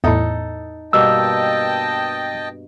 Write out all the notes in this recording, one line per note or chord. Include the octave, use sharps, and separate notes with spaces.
E2 A2 D#4 A4
G2 B2 A#3 D#5 G5 A5 E6